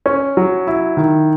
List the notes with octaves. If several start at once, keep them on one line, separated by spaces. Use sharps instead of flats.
C#4
F#3
E4
D#3